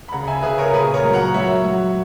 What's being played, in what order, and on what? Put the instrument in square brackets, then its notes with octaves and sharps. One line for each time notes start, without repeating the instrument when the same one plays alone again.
[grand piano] B5
C#3 F#5 A#5
E5 G#5
C#3 G#4 B4
A#4 C#5
A#2 G#4 B4
A#4 C#5
F#3
F#5 A#5
F#3 C#5 E5
F#3